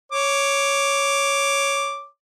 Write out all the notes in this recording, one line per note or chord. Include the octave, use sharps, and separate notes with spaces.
C#5 D6